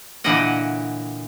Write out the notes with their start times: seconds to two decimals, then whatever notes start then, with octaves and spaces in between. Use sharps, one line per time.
0.24 A#2 D3 E3 D#5 F#5